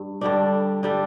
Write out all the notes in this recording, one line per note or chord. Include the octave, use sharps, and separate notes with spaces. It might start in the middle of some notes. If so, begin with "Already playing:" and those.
Already playing: G2
G2 D3 G3 D4
D3 G3 D4